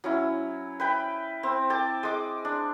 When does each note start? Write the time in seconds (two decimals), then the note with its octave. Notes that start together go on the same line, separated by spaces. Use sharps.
0.04 F#3 C#4 E4
0.80 B4 G5 B5
1.43 C4
1.70 G5 A5 D6
2.03 G#3 D6
2.45 D4